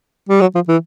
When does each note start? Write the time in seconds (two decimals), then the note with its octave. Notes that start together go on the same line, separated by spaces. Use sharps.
0.29 G3
0.41 F#3
0.55 F3
0.68 E3